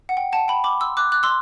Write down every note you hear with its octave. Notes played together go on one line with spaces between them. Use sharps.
F#5
G5
F#5 A5
G5 B5
B5 D6
C6 E6
D6 F#6
D6 F#6
C6 E6